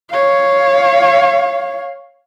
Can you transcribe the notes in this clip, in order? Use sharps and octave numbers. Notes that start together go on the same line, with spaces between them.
C#5 F5